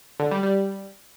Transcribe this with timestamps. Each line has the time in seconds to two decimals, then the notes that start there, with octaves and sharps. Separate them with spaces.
0.20 D3
0.31 G3
0.43 G3